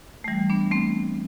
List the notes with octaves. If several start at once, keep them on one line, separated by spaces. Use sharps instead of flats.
A3
E3 G3
B3 D4
A3 C4